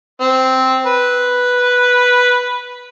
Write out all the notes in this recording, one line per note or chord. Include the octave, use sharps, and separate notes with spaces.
C4
B4